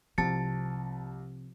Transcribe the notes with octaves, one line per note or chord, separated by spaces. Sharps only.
C2 C3 F3 A5 A6 C#7